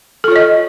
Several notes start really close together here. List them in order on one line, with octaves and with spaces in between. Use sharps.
A4 F4 C#5 D#5